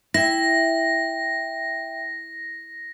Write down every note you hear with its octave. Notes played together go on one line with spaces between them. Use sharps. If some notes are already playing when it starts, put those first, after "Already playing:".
E4 E5 G5 A#6